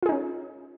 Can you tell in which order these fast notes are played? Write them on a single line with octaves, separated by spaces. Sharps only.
F4 G#4 D#4 C#4